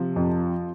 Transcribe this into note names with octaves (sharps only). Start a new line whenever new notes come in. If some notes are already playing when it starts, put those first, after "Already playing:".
Already playing: C3 F3
F2